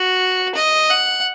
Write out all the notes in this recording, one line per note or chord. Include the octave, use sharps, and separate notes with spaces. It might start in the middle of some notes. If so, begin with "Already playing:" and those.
Already playing: F#4
D#5
F#5